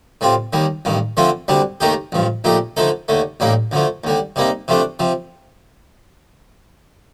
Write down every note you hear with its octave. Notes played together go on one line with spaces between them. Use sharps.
A2 G3 C4 F4
D#2 D#3 G3
A1 G2 D#3
D3 F3 A3 C4 F4
D2 C3 G3 D4
D#2 D#3 A3 D#4 G4
A1 G2 F3
A#1 A#2 A3 D#4 G4
D3 F3 A3 D#4 A4
D#2 D3 A3
A1 A2 G3 A#3 D#4
D2 D3 F3 A3
D#2 D3 G3
C3 G3 A#3 D#4
C3 F3 A3 D4
C3 F3